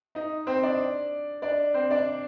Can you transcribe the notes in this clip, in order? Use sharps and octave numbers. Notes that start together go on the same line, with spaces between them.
D#4 D#5
C4 C5
D4 D5
D4 D5
C4 C5
D4 D5